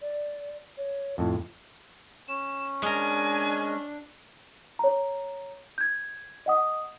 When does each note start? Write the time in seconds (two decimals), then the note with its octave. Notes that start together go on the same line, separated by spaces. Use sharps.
0.01 D5
0.77 C#5
1.18 F2 A2 F4
2.28 C#4 E7
2.83 G#3 D4 A#4 G#5
4.79 C#5 A#5
5.78 G6 G#6
6.46 D#5 F#5 D#6